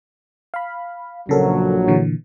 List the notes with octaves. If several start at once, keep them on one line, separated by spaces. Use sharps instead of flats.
F5 B5
A#1 C#3 F#3 A4 A#4
A#2 D3 E3